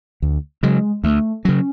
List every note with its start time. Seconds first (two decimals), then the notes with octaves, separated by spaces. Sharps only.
0.22 D2
0.63 C#3 F#3 G#3
1.04 D2 A3
1.44 C#3 F#3 C#4